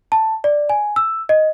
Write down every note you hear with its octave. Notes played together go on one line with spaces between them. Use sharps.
A5
D5
G#5
E6
D#5